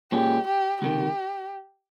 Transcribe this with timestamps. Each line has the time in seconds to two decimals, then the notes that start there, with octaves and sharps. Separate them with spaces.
0.12 A#2 G#3 C#4 G4
0.48 G4
0.82 C#2 C3 D#3 G4